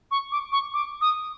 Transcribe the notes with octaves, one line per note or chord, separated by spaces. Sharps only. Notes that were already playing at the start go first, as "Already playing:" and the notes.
C#6
D6
C#6
D6
D#6